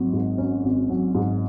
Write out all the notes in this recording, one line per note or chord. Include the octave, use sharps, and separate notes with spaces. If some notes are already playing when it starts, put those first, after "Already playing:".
Already playing: G#1 F#3
G#2
C#4
G#1
F#3
G#2